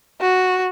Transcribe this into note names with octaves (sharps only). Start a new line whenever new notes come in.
F#4